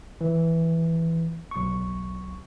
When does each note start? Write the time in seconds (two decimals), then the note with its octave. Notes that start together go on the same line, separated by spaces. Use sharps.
0.21 E3
1.51 B1 C#6